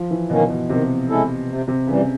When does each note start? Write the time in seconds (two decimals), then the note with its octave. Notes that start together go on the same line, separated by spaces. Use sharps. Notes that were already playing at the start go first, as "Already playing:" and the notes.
Already playing: F3
0.11 E3
0.30 B2 D#3 F#3 A#3 C#4
0.50 B2
0.69 C3 D#3
1.09 G#3 C#4 E4 A4
1.48 C3
1.68 C3
1.87 C#3 E3 G3